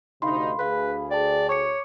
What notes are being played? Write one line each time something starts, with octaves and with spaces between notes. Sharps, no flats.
D2 C3 D#4 F5 B5 C6
D2 G#4 B4 F5 B5
D5 G5 A5
C#5 C#6 D6 C#7